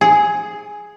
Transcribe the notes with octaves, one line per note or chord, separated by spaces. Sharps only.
G#4